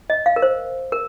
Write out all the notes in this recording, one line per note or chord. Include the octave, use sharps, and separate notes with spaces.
D#5
F5
A#4
C5
A#4